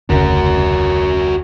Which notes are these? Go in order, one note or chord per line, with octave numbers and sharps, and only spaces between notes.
F1 D2 C#3 F#4 A#4